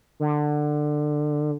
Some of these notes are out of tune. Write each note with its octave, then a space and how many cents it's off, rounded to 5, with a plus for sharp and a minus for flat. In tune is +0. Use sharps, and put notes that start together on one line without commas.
D3 +20